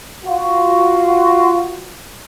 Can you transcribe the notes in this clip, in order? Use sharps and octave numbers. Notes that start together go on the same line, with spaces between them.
F4 F#4